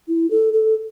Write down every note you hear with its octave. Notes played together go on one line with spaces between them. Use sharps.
E4
A4
A4